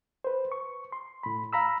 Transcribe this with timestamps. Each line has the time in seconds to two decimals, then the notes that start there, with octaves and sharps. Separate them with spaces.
0.24 B4 C5
0.52 C#6
0.92 C6
1.23 A2 B5
1.53 F5 A#5 B5 E6